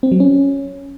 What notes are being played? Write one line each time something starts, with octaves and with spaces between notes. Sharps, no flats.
C4
F#3
C#4